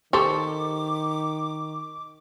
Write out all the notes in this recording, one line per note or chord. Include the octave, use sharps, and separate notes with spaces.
D#3 G4 A4 C5 C#6 D6